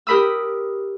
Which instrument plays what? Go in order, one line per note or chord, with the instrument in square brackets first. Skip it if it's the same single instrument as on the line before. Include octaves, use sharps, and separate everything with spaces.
[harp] G4 A#4 B5 D#6 E6